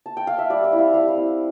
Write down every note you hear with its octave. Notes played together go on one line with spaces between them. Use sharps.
A5
G5
F5
E5
G3 D5
D5
C4 E4
F5
G3 F5
F5
C4 E4